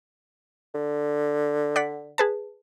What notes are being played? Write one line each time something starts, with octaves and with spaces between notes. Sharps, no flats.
D3
D5 F#5 B6
G#4 B4 A5